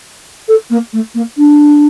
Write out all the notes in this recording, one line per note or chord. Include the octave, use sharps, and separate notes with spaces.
A4
A#3
A3
A#3
D4